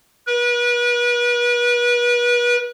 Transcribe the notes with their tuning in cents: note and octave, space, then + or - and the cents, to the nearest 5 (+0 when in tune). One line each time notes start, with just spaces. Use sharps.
B4 -35